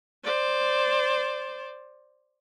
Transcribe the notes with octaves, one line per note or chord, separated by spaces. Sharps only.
C5 D5